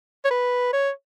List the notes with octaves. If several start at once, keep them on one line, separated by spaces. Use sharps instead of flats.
C#5
B4
C#5